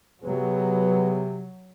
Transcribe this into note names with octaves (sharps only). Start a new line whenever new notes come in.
C3 F#3 B3 G#4 B4